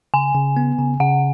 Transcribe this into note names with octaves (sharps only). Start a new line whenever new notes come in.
C#3 G#5
C#3
B3
C#3
C#3 F#5